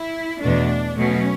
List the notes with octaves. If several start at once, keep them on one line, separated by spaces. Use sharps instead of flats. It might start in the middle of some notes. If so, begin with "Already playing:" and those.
Already playing: E4
E2 B2 A3 D4
B2 F#3 A3 C#4